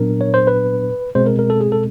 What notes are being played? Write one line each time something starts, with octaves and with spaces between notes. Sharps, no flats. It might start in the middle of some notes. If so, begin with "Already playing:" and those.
Already playing: A#2 F#3 B3 D4 A#4
C#5
C5
B4
B2 G#3 C4 C5
A#4
A#4
A4
G#4
A4